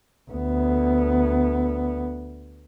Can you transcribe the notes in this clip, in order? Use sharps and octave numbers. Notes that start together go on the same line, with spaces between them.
D2 B3